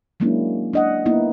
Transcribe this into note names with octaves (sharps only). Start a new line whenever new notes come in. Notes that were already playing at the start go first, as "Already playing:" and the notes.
F#3 G#3 A#3 C#4 D4 E4
D4 D#5 F#5
A#3 B3 D#4 E4